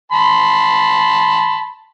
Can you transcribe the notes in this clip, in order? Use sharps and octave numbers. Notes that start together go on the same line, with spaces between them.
A5 B5 C6